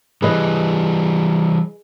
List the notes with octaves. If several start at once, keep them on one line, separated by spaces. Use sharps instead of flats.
E3 G3 G#4 B4 D#5